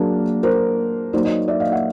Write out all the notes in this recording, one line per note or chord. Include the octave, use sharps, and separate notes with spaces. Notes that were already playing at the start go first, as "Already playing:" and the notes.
Already playing: F#3 A#3 D4 G#4 A#4
A#4 C5
F#3 A#3 D#4 C5 D5
C#5 D#5
D5 E5
D#5 F5
E5 F#5